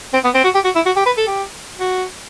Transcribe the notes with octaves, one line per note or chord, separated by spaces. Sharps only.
C4
B3
C4
F#4
G4
F#4
E4
F#4
G4
B4
A4
G4
F#4